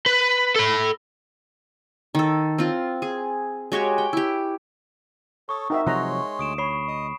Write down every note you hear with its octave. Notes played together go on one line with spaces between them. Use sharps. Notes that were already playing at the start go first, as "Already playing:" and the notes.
B4
A4 B5
D#3 A4
C4 F4
G#4
G#3 F#4 G4 C#5
G5
E4 G4
A4 C#5 C#6 D#6
C4 D#4 F#4 A#4 E5
C3 F3 F#3 G#3 C#5 F#5 A#5 C6
D2 D#6 D7 E7
C#5 B5 C#6 C7
D#5